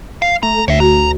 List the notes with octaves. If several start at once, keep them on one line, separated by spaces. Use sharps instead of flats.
F5
A3 A#5
D2 C#5 E5
F#4 A#5